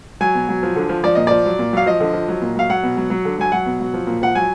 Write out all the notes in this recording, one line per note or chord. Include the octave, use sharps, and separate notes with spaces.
F#3 G#5
B2
F#3
F3
D3
F3
F3 D5
A#2 D#5
F3 D5
F#3
A#2
F#3 F5
F3 D#5
D3
F3
F#3
A#2
F#3 F5
F#3 F#5
B2
F#3
F#3
D3
F#3 G#5
F#3 F#5
B2
F#3
F3
A#2
F3 F#5
F#3 G#5